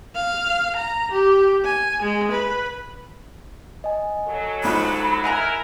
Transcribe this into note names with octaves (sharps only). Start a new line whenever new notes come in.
F5
A#5
G4
G#5
G#3
B4
D#5 G#5
F#3 A4
A#1 G#2 F4 B5
E4 A#4 F#5 G#5 A#5